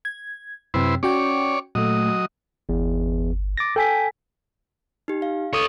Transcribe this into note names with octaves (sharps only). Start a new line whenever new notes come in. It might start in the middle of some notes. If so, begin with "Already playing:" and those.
G#6
F#2 C3 E4 B4 C5
C#4 F#4 C#5 D5 G5
A#2 F#3 A3 D#5
G1 E2
D6 A6 A#6
A4 G5 G#5 B6
D#4 G4
F5
A4 C#5 D#5